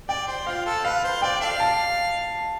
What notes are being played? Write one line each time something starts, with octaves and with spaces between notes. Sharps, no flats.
D5 G5
C5
F4 F5
A4
B4 F5
C5
D5 G5
A4 D5 F5
A5